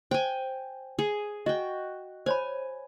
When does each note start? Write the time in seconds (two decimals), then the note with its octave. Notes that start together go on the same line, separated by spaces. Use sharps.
0.11 C5 G5 G#5
0.99 G#4
1.46 F#4 D#5 G5
2.26 C5 C#5 G#5 B5